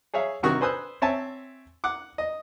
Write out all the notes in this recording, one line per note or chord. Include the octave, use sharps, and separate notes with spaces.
G#4 C#5 E5 F5
G2 C3 D#3 F#4 C#6 D#6
B4 C5 G#5 D#6 E6 F#6
C4 C#5 E5 G#5 A5
F#5 D6
D#5